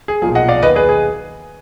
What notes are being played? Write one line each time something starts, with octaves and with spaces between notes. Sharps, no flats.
G#4
B1 A#2 F3 G#4
D#5 F#5
D5 F5
D#2 D#3 B4 D#5
G#4 B4
G#4